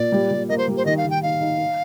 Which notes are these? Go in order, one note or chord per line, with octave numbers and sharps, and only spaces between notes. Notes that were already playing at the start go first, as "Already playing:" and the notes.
Already playing: A#2 D5
G3
G3
A#3 D#5
C5
G3
C5
D#3 D#5
F5
D#3
G5
D#4 F5
D#4
D#4